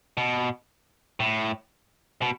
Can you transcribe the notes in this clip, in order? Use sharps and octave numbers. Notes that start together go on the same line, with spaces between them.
B2
A2
B2